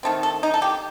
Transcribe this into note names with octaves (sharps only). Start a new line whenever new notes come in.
D#3 A3 C4
A4
D#4
A4
G4